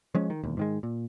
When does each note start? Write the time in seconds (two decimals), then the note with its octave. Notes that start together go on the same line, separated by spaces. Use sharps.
0.15 F3 G#3 C#4
0.30 D#3
0.43 E1 D#2
0.57 G#2 D#3 G#3
0.83 A#2